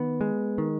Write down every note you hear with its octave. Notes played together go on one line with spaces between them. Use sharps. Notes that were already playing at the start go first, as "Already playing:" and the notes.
Already playing: D#3 B3
G#3
D#3